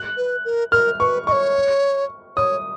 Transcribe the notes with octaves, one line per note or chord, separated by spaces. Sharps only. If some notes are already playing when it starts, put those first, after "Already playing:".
Already playing: F#6
B4
A#4
A#4 F6
B4 C#6
D#5 C#6
C#5
C#5 D#6